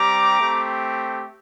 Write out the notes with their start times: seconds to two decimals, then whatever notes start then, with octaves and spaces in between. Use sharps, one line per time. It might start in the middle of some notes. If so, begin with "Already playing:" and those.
Already playing: G3 C4 G4 A#5 D6
0.40 A3 C4 G4